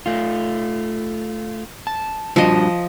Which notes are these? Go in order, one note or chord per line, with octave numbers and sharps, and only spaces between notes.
A3 F4
A5
F3 G3 D4 F#4 D#5